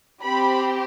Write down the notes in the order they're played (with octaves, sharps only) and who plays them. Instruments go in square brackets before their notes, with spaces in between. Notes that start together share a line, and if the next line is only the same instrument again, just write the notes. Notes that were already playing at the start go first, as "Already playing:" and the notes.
[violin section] C4 G4 B5